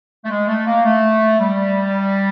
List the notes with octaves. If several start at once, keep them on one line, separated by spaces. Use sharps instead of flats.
A3
G#3
A3
A#3
A3
G3